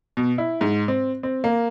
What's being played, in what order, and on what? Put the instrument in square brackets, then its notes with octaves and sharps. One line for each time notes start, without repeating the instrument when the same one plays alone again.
[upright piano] B2
E4
G#2
C4
C4
A#3